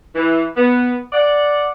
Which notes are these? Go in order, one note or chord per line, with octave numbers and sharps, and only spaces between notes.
E3
B3
D5 F#5